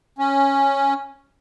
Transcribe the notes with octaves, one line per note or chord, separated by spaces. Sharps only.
C#4